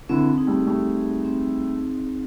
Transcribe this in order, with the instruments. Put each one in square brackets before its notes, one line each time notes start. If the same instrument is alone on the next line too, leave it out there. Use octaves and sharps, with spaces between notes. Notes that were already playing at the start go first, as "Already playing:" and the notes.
[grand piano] D3 E3 [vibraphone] C4
[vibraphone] D#4 G#4
[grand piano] G3 A3
[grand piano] G3 A3 [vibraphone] C4
[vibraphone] D#4 G#4
C4